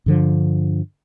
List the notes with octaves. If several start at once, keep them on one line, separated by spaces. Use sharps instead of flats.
G2 D3 F3